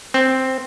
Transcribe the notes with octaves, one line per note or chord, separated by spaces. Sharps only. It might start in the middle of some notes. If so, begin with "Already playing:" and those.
C4